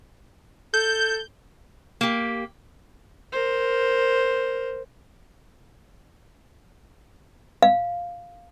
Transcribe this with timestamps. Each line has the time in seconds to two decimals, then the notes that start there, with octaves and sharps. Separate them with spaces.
0.74 A4 G6
2.01 A#3 G4
3.32 A#4 C5
7.62 F5